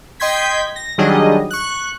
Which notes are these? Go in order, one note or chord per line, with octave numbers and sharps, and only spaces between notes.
D#5 G5 C6 G6 G#6 B6
A#6
D#3 F#3 G3 D4 G#4 D#5
C#6 F#6